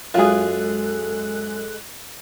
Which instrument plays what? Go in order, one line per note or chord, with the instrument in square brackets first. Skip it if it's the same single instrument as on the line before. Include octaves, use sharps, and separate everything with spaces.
[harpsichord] F#2 [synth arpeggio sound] G#3 F#6 [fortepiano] F4 G#4 [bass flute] A4